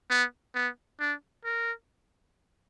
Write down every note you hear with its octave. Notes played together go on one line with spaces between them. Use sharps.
B3
B3
D4
A#4